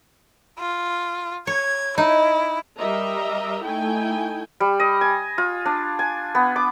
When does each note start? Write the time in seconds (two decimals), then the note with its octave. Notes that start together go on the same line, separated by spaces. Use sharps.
0.59 F4
1.47 C#5 G#6
1.98 D#4 E4
2.77 G3 A#4 D#5 E5 A#5
3.64 A3 D#4 E4 G5 G#5
4.60 G3
4.80 D#5
5.01 G#5
5.38 F4
5.66 D4
5.99 G#5
6.35 B3
6.56 D6